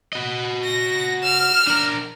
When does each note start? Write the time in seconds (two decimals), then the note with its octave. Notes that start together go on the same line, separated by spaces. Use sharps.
0.13 F#4 D#5
0.64 A#6
1.23 F6 E7
1.67 D4 A#4